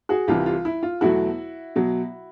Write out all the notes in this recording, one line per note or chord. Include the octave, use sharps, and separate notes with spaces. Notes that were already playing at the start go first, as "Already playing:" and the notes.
F#4 G#4
C2 C3 E3 G3 F4 G4
F4
E4
F4
E2 B2 F#3 A3 E4 F#4
B2 F#3